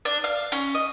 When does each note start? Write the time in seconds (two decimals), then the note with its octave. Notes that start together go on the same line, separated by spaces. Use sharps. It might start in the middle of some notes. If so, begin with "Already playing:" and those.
0.05 D4
0.24 F5
0.52 C#4
0.75 D#5